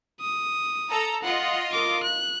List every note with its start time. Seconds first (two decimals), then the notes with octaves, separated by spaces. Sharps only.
0.21 D#6
0.91 A4 A#5
1.23 F4 D#5 F#5
1.72 A#4 D6
2.03 F#6